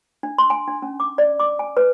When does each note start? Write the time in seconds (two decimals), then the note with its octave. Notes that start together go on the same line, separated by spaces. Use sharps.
0.23 D4
0.38 C6
0.50 G#5
0.68 D4
0.82 C#4
1.00 D6
1.18 D5
1.39 D6
1.59 G#5
1.77 B4